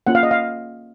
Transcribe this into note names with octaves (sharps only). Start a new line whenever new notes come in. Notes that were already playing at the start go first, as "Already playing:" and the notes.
A#3 C#4 F4 F#5
F5
D#5
F5